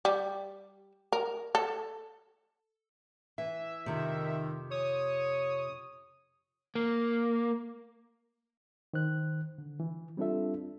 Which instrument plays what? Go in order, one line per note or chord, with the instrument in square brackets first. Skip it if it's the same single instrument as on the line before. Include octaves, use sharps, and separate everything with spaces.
[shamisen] G3
A#4
A4
[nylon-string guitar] E3 [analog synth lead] E5
[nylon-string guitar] F2 C3 [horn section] D#3
[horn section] C#5 [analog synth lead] D#6
[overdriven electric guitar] A#3
[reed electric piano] D#3 C5 F#6
D3
E3
G3 C4 D4 F4 A4 E5